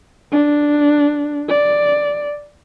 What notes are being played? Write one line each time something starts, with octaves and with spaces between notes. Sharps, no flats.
D4
D5